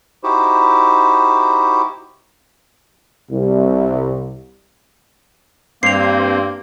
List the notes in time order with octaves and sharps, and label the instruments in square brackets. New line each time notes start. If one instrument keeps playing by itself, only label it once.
[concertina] D#4 E4 F#4 G4 C5
[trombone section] C2
[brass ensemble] G2 [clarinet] A#3 [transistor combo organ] C4 [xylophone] C7 F7